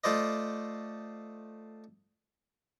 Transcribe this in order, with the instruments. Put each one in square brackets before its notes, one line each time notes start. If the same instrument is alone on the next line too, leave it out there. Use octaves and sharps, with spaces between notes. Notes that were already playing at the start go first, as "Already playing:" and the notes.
[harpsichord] A3 F4 C5 D5 D#5